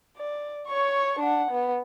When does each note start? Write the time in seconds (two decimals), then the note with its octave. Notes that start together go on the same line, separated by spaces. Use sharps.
0.17 D5
0.68 C#5 C#6
1.19 D4 F#5
1.51 B3